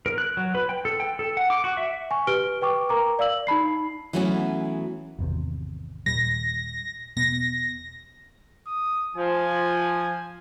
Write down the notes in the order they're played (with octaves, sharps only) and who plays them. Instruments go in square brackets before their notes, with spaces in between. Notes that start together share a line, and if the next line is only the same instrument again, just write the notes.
[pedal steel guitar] A#4
F#6
F#3
B4
G5
A4
G5
A4
F#5
D6
F#4
E5
[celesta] G#5 C#6
G4 B4 F6 D7 G7
B4 G5 C#6 D6
A#4 A#5 D6
D5 F5 E6 F#7
D#4 A5 B5 C7
[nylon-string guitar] E3 F#3 A3 B3 C#4 F#4
[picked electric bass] G#1 E2 C3
[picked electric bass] D#1 A#2 G3 [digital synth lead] A#6
[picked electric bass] E1 B2 B3 [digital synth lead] A#6
[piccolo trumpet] D#6
[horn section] F3 [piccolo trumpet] G#5